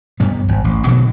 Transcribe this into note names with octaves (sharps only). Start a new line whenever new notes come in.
G2 G3 B3
G#1
A1
B2 D3 D#3 F#3